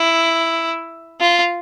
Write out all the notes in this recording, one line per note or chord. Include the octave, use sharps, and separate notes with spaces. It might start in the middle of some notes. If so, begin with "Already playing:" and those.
Already playing: E4
F4